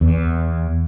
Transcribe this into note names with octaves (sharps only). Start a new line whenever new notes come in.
E2